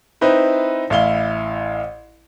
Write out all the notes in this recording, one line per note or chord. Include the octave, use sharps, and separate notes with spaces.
C4 D#4 E4 B4 C5
A1 E4 F5 G7